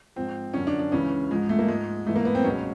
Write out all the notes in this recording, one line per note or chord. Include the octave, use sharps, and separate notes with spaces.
G#2 F3 C4
F#2 D3 F3 C#4
D4
D4
C#2 C#3 E3 C#4
G#2 F3 G#3
A3
A#3
G#2 F3 G#3
G#2 E3 A3
A#3
B3
C4
C#2 B2 F#3 C#4